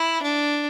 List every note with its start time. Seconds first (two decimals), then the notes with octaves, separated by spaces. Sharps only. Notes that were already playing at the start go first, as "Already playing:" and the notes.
Already playing: E4
0.22 D4